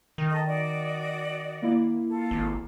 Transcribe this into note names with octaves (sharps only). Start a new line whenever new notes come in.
D#3
A4 D#5
F#4 D5 D#5
A#3 E4
F4 A4
G#1